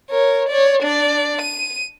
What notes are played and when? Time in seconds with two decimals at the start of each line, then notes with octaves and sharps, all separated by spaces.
0.10 A#4 C#5
0.49 C#5 D5
0.83 D4 D5
1.41 D#7